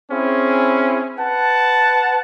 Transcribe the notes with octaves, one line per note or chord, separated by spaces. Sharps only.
C4 C#4 E4 G#4
B4 F#5 A5